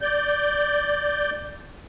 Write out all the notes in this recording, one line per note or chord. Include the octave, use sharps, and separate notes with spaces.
D5 G6